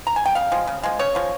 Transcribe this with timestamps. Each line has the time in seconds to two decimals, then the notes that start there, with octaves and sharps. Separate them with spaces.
0.07 A#5
0.16 G#5
0.26 G5
0.35 C#3 F5
0.52 F3 G#3
0.67 C#3
0.83 F3 G#3
0.99 C#3 C#5
1.15 F3 G#3